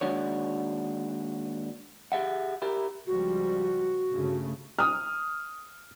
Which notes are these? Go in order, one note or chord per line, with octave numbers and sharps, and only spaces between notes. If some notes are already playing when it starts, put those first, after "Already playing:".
D#2 G#3 D4 F#4 C#5
G4 G#4 E5 F#5
E4 G4 A#4
C#2 F3 G3 F#4
G1 C#3 A3
D#6 F6